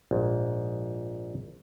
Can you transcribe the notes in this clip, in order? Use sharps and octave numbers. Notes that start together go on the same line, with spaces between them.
A#1 G#2